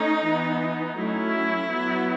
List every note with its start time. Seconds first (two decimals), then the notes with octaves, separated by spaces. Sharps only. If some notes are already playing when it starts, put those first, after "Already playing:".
Already playing: A3 C#4 D#4
0.27 E3 B3
0.98 F#3 A3 C#4 E4
1.69 F#3 B3